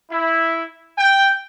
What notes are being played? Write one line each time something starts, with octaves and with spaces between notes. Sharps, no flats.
E4
G5